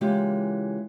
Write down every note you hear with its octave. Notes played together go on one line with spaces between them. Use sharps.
C#3 E3 G#3 A#3 F4 G4